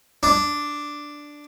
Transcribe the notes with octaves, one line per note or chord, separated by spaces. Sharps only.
D4